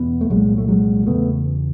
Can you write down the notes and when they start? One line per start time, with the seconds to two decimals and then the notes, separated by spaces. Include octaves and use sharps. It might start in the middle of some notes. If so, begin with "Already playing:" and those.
Already playing: E2 B2 B3
0.21 A3
0.30 C2 A#2 F#3 G#3
0.58 A3
0.68 F#3 G#3
1.07 E2 C#3 A3 B3